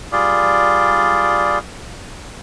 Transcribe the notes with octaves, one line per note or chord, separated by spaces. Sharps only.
G3 F4 G#4 D5